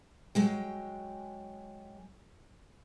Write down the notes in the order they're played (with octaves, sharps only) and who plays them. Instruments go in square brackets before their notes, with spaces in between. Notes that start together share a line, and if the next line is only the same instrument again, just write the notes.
[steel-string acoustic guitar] F#3 G#3 G5